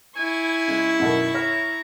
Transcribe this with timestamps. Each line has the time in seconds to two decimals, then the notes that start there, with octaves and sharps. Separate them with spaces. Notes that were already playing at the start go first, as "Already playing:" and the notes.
0.17 E4 G#5 C#6
0.68 C#3 G#3
1.00 F#2 B2 D#3
1.34 C#5 E5 A#5 F6